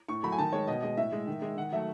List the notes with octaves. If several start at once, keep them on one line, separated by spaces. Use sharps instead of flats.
A2 C#6
F#3 A3 B5
G#5
D#3 A5
G#3 C#5
B2 D#5
G#3 D#5
A2 E5
G#3
D#3
G#3
D#3 F#5
F#3 A3 E5